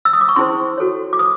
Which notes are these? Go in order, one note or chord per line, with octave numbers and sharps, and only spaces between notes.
E6
D#6
D6
C#6
C#4 E4 G#4 C5 C6
F#4 A4 C#5
D6
B4 D#6